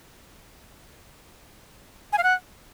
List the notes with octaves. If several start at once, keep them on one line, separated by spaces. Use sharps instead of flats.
G#5
F5
F#5